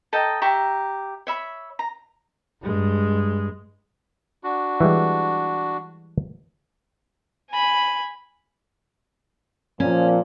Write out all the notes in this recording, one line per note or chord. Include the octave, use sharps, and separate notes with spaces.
A4 D#5 G5 A#5
G4 E5 A#5 C#6
C#5 E5 B5
A#5
G2 G#3
D4 F#4
E3 G3 G#3
G#5 B5
A#2 F3 C#4